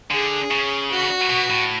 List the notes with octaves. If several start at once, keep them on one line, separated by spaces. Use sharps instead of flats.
D3 G#4
C#3
F#4
B2
A2